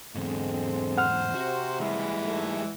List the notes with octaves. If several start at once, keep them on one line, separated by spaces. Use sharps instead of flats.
E2 G#2 D3 G#3 C4
C5 F#5 F6
C3 F#4
E3 G3 G#3 E4
G#2 A3